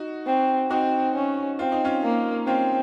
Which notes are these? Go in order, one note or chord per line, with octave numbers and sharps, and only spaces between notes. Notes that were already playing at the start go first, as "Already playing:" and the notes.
Already playing: D#4 F#4
C4
C4 D#4 F#4
C#4
C4 F4
D#4
C#4 F4
A#3
C4 C#4 F4